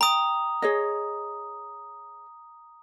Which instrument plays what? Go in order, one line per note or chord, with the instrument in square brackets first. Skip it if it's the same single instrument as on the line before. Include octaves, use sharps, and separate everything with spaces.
[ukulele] G5 [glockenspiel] A#5 D#6
[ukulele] G#4 C#5 D#5